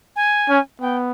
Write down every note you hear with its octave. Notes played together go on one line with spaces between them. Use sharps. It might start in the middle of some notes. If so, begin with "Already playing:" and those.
G#5
C#4
B3 G5